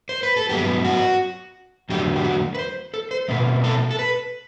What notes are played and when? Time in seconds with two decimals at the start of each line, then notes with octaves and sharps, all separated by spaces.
0.09 C5
0.23 B4
0.37 A4
0.49 G2 F#3 B3 G4
0.84 F#4
1.89 E2 D3 F#3 A3 G4
2.16 G4
2.24 F#4
2.55 B4
2.59 C5
2.94 A4
3.11 C5
3.28 B2 A3 C4 B4
3.64 A4
3.91 A4
3.99 B4